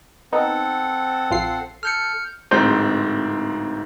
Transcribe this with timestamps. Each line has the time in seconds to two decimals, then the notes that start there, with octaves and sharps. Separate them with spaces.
0.33 B3 C4 D#4 A4 F#5
1.31 A#1 F4 C7
1.83 A4 F6 G6 C#7
2.51 D1 G#2 C4 G6